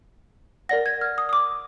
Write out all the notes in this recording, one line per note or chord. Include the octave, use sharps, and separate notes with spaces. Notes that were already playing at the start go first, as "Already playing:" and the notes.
A#4 D5 F#5 A#6
G#6
F6
D#6
D#6
D6